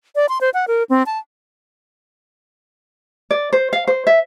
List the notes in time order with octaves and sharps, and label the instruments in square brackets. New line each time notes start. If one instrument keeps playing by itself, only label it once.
[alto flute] D5
C6
C5
F#5
A#4
C4
A5
[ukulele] D5
C5
F5
C5
E5